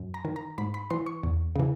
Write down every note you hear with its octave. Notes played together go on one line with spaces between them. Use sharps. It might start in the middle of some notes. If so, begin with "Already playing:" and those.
Already playing: F#2
A#5
D#3
A#5
G#2 B5
B5
E3 C6
C#6
E2
C#3 E3